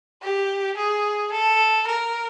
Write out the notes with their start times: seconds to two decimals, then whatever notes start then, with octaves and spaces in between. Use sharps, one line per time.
0.22 G4
0.77 G#4
1.32 A4
1.87 A#4